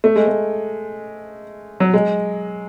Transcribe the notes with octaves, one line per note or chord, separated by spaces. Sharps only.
A3
G#3
A3
F#3
G#3